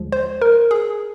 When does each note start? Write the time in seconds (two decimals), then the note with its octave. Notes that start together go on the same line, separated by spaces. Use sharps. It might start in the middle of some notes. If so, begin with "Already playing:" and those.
Already playing: D#2 D3 F3 G#3
0.12 C5
0.42 A#4
0.71 G#4